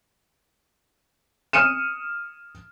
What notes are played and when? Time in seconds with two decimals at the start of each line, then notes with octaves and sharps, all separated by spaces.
1.53 D#6 F6 C#7 D#7 E7